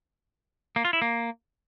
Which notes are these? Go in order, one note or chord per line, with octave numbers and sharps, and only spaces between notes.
A#3
F4
E4
A#3